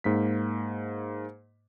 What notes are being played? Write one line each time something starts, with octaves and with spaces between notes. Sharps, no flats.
G#2 A#3 B6